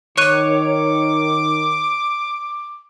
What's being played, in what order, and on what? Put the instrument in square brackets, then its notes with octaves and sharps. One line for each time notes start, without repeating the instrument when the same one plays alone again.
[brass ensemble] D#3 [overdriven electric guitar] C#5 [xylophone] C#6 F#6 D#7 [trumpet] D6